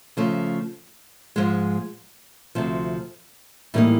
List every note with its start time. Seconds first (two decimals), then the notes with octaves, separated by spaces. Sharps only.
0.17 C#3 F3 A3
1.36 G#2 F3 G#3
2.55 D2 C3 F3
3.74 A2 E3 G3 A#3 D#4